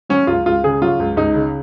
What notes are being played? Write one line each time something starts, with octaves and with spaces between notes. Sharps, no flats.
F#3 C#4
C#2 F4
C#2 F4
C#3 G#4
F#3 F4
C#2
C#2 D#4
C#3